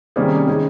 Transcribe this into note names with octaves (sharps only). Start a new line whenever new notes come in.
C3 D#3 G3 A#3 C#4 G#4
D#3 G#3 C#4